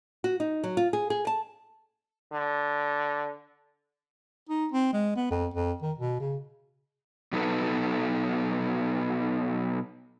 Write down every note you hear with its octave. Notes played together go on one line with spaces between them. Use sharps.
F#4
D#4
F#3
F4
G#4
G#4
A5
D3
D#4
C4
G#3
B3
F2
F2
D#3
B2
C#3
B2 F#3 B3 D#4 A4 B4